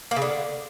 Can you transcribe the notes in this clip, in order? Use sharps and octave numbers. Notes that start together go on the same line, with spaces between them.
A#3
C#3
D3